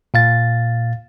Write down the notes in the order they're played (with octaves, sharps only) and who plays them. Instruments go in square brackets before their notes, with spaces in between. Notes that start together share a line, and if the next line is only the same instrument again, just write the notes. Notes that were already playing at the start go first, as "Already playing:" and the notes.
[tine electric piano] A#2 F5 A6